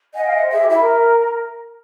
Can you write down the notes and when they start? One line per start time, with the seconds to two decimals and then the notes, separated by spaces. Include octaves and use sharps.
0.14 D#5 F#5 G#5
0.24 F5 G5
0.34 E5 F#5
0.42 C5
0.51 G#4 E5
0.61 G4
0.70 E4 E5
0.79 A#4